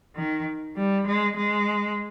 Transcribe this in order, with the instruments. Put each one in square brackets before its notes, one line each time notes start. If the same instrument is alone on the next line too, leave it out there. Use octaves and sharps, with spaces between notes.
[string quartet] D#3
G3
G#3
G#3